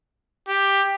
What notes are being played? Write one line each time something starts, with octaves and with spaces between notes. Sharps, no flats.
G4